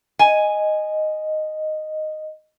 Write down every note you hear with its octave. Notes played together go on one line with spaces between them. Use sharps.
D#5 G#5